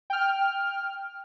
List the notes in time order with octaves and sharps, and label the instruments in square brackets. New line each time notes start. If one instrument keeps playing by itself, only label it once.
[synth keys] G5 F6